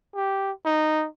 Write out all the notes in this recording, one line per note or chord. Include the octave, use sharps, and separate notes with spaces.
G4
D#4